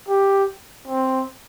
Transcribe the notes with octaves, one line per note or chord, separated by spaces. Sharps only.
G4
C4